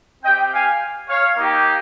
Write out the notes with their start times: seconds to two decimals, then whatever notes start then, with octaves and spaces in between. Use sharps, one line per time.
0.23 C4 D#5 G5
0.28 G4
0.52 F5 G#5
1.08 C#5 F5
1.36 A#3 D#4 G4